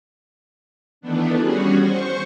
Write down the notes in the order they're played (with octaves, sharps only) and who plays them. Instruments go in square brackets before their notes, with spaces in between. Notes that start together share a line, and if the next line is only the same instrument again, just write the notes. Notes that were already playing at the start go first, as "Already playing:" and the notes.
[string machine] D#3 E3 A3 B3 D4
G3 C#4 F#4 G#4
C5 C#6